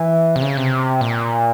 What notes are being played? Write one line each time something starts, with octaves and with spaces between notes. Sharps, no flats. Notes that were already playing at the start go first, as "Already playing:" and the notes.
Already playing: E3
C3
C#3
C3
A#2